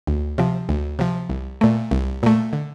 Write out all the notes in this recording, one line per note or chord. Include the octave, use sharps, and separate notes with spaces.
D2
C3 F3
D2
C3 F3
C2
A#2 A3
C2
A#2 A3
D3